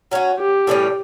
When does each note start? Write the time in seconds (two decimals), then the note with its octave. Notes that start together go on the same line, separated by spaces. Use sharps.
0.11 F#3 C#4 F#4
0.39 G4
0.67 A2 E3 G3 C#4